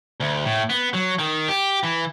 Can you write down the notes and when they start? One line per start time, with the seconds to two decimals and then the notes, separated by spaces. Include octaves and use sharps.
0.20 D2
0.45 A2
0.70 B3
0.93 F#3
1.19 D#3
1.48 G4
1.83 E3